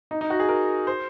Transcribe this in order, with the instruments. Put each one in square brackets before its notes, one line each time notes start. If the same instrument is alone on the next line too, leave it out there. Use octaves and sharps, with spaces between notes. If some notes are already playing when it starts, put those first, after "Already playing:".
[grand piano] D#4
D#4
F#4
G#4
A#4
C5